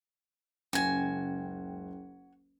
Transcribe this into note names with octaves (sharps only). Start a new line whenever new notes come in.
F#1 C#2 F#4 G5 G#5